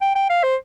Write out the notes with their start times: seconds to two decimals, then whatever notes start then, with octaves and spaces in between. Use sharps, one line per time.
0.01 G5
0.15 G5
0.30 F5
0.43 C5